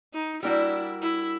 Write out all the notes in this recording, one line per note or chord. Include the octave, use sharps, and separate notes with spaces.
D#4
G3 A#3 D4 E4 F#4
E4